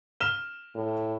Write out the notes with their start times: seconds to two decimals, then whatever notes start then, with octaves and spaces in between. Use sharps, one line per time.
0.21 F6 E7 G7
0.75 A2